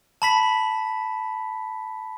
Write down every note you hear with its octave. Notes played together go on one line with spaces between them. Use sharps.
A5 B5 B6